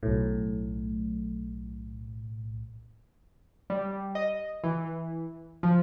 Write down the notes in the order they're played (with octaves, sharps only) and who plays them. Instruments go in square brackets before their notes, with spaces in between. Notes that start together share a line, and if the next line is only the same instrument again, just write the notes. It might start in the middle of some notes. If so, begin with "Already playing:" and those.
[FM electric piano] B1 A2
[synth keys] G3
D#5
E3
F3